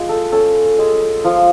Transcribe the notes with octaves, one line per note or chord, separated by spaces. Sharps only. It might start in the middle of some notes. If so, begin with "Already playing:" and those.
Already playing: G#3 F4
A4
C#4 A4
G#3
F3